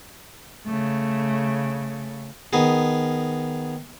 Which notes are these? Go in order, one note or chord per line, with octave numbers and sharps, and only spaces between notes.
C#3 A3
D#3 B3 G#4